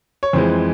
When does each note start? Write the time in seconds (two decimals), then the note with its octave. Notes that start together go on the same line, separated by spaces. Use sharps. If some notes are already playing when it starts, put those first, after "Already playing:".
0.23 C#5
0.33 F2 E3 G#3 C5